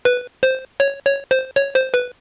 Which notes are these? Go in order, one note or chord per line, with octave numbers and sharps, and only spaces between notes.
B4
C5
C#5
C#5
C5
C#5
C5
B4